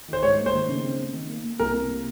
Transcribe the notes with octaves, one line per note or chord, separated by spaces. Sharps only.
D#3 C5
G#2 C#5
A#3
C5
D#3
C#3
C4
C4
D#3
A#3
A#3
C2 A#4
C3
A#3